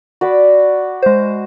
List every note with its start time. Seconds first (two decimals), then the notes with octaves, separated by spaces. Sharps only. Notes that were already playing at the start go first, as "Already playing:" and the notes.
0.21 F#4 D5 B5
1.02 G#3 C5